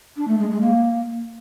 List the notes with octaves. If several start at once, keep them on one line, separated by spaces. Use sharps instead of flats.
D4
A3
G#3
G#3
A#3